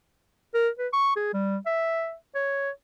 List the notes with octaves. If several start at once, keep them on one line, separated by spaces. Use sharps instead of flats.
A#4
B4
C#6
G#4
G3
E5
C#5